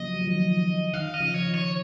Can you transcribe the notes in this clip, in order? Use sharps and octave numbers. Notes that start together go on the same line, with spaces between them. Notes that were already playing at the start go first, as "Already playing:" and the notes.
Already playing: C#3 F3 F#3 A#3 D#5
F#3
F3
D#3 F#3
D#3 F5
D#5
C#3 F3
C#5
D#3
C#5